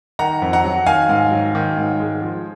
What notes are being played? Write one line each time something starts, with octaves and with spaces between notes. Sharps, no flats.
D#3 F#5 A#5
F2
F#5 A#5
F#3
D#3 F5 G#5
G#2
F#3
D#3
G#2
G#3
F3